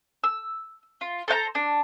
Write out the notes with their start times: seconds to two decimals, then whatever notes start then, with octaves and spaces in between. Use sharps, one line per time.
0.24 E6
1.01 F4
1.28 A4 C5 F#5 A#5
1.55 D4